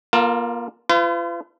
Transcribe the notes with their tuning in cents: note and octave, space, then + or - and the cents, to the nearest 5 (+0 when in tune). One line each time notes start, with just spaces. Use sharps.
A#3 +35 F4 +0 A#4 -40
F4 -35 B4 +45